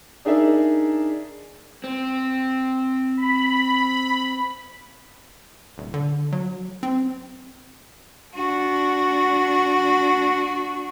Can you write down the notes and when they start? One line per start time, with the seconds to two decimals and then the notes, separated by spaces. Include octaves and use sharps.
0.25 D4 D#4 G#4 A#4 D5 E5
1.84 C4
3.17 B5
5.78 D#1
5.94 D3
6.32 F#3
6.83 C4
8.34 D4 F#4